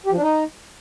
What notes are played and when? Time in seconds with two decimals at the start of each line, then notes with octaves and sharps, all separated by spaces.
0.06 G4
0.12 F3
0.17 D4
0.22 D#4